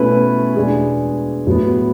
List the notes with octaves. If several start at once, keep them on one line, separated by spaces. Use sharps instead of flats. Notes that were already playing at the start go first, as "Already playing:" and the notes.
Already playing: B2 A3 C#4 E4 B4
E2 B2 G#3 B3 D4 G#4
A2 F#3 B3